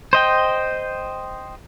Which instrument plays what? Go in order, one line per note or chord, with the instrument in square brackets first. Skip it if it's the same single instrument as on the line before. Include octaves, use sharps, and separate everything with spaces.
[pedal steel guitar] C5 D#5 G5